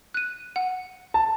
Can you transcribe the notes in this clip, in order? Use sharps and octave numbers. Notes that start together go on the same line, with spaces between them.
F#6 D#7
F#5
A5